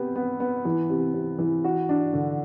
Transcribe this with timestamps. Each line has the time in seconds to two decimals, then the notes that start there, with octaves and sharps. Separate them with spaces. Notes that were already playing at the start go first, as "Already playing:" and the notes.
Already playing: C3 B3 G4
0.16 B3
0.40 B3
0.65 E3
0.90 C3
1.14 C3
1.39 E3
1.64 F#4
1.89 D4
2.14 D3